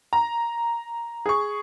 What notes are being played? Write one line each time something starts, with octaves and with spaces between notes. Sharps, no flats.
A#5
G#4 C#6